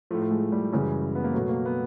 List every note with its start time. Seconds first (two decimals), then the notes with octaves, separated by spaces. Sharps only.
0.11 F3 A3
0.14 A2
0.22 A3
0.31 G#3
0.52 G3
0.72 F#2 C#3 E3 G3 G#3
1.15 B3
1.24 A#3
1.34 B2 F#3 A3
1.49 A#3
1.65 B3